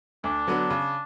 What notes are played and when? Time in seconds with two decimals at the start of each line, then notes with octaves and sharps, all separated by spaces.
0.24 D2 D4
0.47 D3 F#3 B3
0.70 C#3